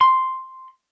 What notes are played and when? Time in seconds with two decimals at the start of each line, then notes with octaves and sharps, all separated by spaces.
0.01 C6